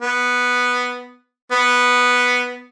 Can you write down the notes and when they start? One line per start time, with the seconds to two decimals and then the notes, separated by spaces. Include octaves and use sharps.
0.02 B3
1.52 B3